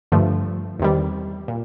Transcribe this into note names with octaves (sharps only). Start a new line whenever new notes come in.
G2 D3 F3 A3
E2 C3 D#3 G3
A#2